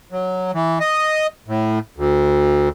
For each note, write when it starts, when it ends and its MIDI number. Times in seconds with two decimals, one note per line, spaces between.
0.12 0.51 54
0.54 0.79 52
0.80 1.27 75
1.48 1.79 45
1.97 2.69 38